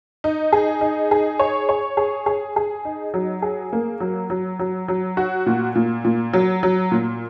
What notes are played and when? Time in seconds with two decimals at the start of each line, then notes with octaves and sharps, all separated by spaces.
0.24 D#4
0.52 G#4
0.81 D#4
1.11 G#4
1.39 C#5
1.69 C#5
1.97 G#4
2.26 G#4
2.56 G#4
2.85 D#4
3.14 F#3
3.42 G#4
3.73 A#3
4.00 F#3
4.30 F#3
4.59 F#3
4.88 F#3
5.17 F#4
5.46 A#2
5.75 A#2
6.05 A#2
6.34 F#3
6.63 F#3
6.91 A#2